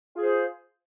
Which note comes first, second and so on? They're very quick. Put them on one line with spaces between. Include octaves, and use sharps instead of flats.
F4 G#4 C5